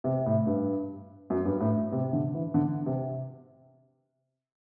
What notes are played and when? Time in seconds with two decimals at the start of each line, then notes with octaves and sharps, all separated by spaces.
0.04 C3
0.26 A2
0.47 G2
1.30 F#2
1.46 G2
1.60 A2
1.92 C3
2.13 D3
2.34 E3
2.54 D3
2.86 C3